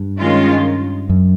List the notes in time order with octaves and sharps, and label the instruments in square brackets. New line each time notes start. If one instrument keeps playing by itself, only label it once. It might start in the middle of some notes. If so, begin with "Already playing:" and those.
Already playing: [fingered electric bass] G2
[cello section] D#3 G#3 C#4 F4
[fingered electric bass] F#2